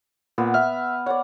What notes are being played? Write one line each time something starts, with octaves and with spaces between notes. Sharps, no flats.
A#2 B3
E5 F6
C#5 D5 F#5